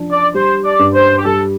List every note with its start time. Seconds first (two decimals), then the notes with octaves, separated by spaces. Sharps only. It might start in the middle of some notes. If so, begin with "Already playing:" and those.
Already playing: F3 D4
0.12 D5
0.34 G3 C5
0.65 D5
0.79 G2
0.94 C5
1.18 G4
1.25 G3 A4